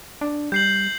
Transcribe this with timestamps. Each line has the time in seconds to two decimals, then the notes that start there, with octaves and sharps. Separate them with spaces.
0.21 D4
0.52 G3 G6 C7 F#7